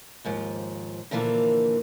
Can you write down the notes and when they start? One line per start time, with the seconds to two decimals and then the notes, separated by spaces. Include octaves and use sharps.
0.25 D#2 G#2 F3
1.11 A#2 D3 E3 F3 A#3